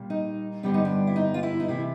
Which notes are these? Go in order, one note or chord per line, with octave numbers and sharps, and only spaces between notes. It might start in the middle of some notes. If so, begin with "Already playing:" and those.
Already playing: A#2 G3 A#3
D#4
G2 D3 G3 B3 D4
D#4
D4
E4
D#4
F4
E4
D#4
C3 E3 A3 E4